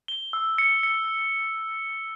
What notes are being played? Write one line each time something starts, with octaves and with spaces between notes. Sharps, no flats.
G7
E6
C#7
C#7